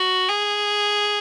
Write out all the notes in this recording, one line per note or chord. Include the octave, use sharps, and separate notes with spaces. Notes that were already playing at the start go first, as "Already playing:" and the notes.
Already playing: F#4
G#4